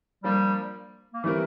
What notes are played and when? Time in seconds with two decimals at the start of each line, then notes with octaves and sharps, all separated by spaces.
0.24 F3 G3 A#3 D4
1.14 A#3
1.24 E3 G3 A3 C4 E4 A#4